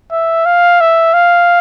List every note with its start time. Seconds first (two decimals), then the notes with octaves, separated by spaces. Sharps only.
0.12 E5
0.46 F5
0.80 E5
1.14 F5